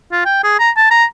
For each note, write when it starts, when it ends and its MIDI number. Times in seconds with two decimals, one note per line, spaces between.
0.12 0.20 65
0.25 0.40 79
0.44 0.54 68
0.59 0.70 82
0.77 0.86 81
0.91 1.05 82